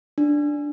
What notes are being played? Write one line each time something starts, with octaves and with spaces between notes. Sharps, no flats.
D4